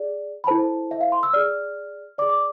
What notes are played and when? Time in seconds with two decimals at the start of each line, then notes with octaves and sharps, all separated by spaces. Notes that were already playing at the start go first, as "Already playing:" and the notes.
Already playing: G#4 D5
0.44 B5
0.47 E4 A4 C5 A5
0.91 E5
1.01 F5
1.12 C6
1.23 E6
1.33 G#4 D5 F6
2.18 D5 D6
2.22 G#4
2.29 D6